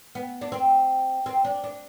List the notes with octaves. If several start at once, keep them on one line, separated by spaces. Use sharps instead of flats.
B3
D4
C4
C4
D4
D4